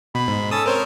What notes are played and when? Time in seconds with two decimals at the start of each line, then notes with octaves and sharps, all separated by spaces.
0.15 B2 B5
0.28 G#2
0.51 C#4 A4 D#6 E6 A6
0.66 C4 A#4 C5 C#5